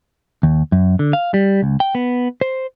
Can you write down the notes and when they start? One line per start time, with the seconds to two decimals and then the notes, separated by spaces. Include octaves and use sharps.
0.43 D#2
0.72 F#2
0.99 D3
1.13 F5
1.34 G3
1.62 C#2
1.80 G5
1.95 B3
2.41 C5